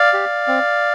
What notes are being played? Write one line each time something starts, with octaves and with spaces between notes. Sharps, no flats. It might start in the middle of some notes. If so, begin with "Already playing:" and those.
Already playing: D5 F5
G4
C4